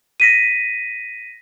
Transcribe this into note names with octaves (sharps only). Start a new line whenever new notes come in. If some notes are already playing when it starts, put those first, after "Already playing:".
A#6 B6 D#7